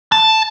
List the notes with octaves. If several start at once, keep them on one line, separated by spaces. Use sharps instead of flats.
A5